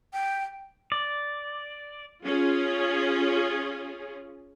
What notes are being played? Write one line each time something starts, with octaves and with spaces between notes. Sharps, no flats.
G5
D5
C#4 F4 G#4